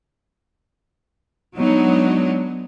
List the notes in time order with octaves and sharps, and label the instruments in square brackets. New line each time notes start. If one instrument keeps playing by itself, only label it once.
[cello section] F#3 G#3 B3 D4 D#4